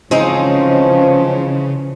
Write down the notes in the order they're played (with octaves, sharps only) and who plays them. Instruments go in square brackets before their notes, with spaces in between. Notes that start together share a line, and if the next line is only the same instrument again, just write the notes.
[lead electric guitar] C#3 [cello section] E3 C#4 [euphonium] F3 [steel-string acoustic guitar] G#3 C4 D#4